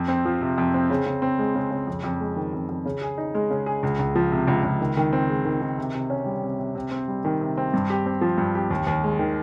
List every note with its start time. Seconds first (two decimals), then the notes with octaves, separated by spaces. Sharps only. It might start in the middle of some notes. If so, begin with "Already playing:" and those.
Already playing: F2
0.08 C4
0.25 F3
0.41 C3
0.58 F2
0.74 C4
0.90 C#3
1.06 C#3
1.22 C4
1.39 G#3
1.55 C#3
1.71 C#3
1.87 F2
2.04 F2
2.20 G#3
2.36 D#3
2.53 F2
2.69 F2
2.86 C#3
3.01 G#4
3.18 D#4
3.35 G#3
3.50 C#3
3.66 G#4
3.83 C#2
3.99 C#2
4.15 F3
4.32 C3
4.48 C#2
4.64 C#2
4.80 D#3
4.97 D#3
5.13 C4
5.29 G#3
5.45 D#3
5.62 D#3
5.78 C3
5.94 C3
6.10 C#4
6.26 G3
6.43 C3
6.59 C3
6.75 C3
6.91 C4
7.08 G3
7.25 D#3
7.41 C3
7.57 C4
7.74 G2
7.90 G4
8.06 C4
8.21 F3
8.38 G2
8.55 G4
8.70 D#2
8.87 D#2
9.04 G#3
9.19 D#3